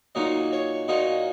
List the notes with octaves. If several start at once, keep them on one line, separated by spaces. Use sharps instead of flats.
A#2 F#3 A#3 D#4 D#5
C#5
A#2 F#3 A#3 D#4 D#5